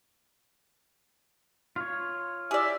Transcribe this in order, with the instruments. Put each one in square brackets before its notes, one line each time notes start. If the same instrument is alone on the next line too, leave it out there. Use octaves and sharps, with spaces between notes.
[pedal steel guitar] F4 C#5
[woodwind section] E4 G4 E5 [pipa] G#4 D5